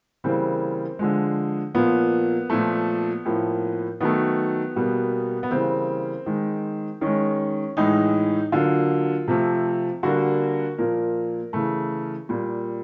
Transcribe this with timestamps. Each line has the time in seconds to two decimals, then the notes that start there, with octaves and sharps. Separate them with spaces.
0.24 C#3 E3 G3 A#3 C4
0.99 D3 F3 G#3
1.75 A#2 F3 A#3 B3
2.50 A#2 F3 A3
3.25 A2 F3 A#3
4.01 D#3 F#3 A3 B3
4.76 B2 G3 A#3
5.43 B3
5.51 C#3 E3 G3 A#3 C4
6.26 D#3 G#3
7.01 D#3 G#3 C#4
7.77 A2 E3 G#3 D#4
8.52 D3 F#3 A#3 F4
9.28 C3 F3 A3
10.03 D3 G3 A#3 F#4
10.78 A#2 F3 A#3 A#4
11.53 C#3 E3 A3
12.29 A#2 G3 A#3